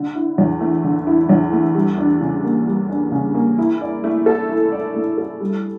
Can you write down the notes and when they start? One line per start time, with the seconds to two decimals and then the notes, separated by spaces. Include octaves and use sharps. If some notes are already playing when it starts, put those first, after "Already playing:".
Already playing: D3
0.15 E4
0.38 E2
0.61 A3
0.84 D3
1.07 E4
1.29 E2
1.53 A3
1.75 G3
1.98 D4
2.21 C#3
2.44 A#3
2.67 G3
2.90 D4
3.12 C#3
3.35 A#3
3.58 E4
3.81 D5
4.04 A3
4.26 A4
4.49 E4
4.72 D5
4.95 A3
5.18 A4
5.40 G3